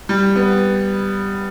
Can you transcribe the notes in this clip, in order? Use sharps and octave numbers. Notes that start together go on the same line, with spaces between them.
G3
B3